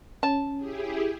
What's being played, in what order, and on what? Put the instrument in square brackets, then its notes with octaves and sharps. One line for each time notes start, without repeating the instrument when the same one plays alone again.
[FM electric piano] C#4 [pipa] A5
[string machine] E4 G4 G#4